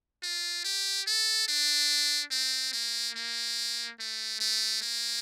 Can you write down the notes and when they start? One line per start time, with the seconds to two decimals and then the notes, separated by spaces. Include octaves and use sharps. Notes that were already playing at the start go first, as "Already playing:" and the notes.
0.23 F4
0.64 G4
1.07 A4
1.48 D4
2.31 C4
2.73 A#3
3.16 A#3
3.99 A3
4.40 A3
4.82 A#3